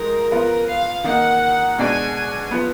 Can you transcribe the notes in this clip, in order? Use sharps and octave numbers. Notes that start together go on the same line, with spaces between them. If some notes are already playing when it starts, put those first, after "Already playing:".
Already playing: F3 G#3 D#4 A#4
F3 B3 F4 B4
F5
D#3 A#3 D#4 F#5
B2 G#3 D4 F#4 D5 G#5
F3 B3